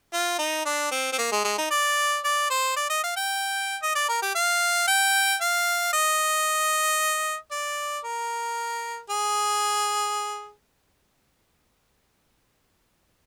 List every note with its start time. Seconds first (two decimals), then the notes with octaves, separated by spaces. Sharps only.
0.13 F4
0.39 D#4
0.65 D4
0.92 C4
1.12 C4
1.18 A#3
1.32 G#3
1.44 G#3
1.58 D#4
1.71 D5
2.24 D5
2.50 C5
2.76 D5
2.90 D#5
3.03 F5
3.16 G5
3.82 D#5
3.95 D5
4.09 A#4
4.22 G4
4.35 F5
4.87 G5
5.41 F5
5.93 D#5
7.51 D5
8.04 A#4
9.10 G#4